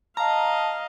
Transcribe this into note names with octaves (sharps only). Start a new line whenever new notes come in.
D#5 F5 A5 A#5